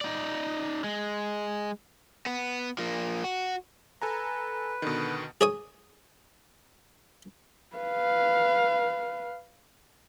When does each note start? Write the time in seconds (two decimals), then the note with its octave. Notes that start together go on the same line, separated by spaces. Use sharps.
0.01 D#4 D5
0.84 G#3
2.26 B3
2.78 F3 A#3
3.24 F#4
4.02 A4 B4 G#5 A#5
4.82 B2 D3 D#3
5.41 G#4 C#5 D#6
7.76 B4 F5